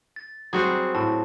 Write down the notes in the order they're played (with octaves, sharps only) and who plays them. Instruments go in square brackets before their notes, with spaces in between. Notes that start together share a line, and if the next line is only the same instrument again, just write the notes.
[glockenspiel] A6
[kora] F#3 G3 E5 [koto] C4 F#4 G#4
[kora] A2 [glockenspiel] A5